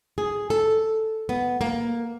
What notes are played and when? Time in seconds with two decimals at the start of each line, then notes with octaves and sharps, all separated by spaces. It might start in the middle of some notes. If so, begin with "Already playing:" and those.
0.18 G#4
0.50 A4
1.29 B3
1.61 A#3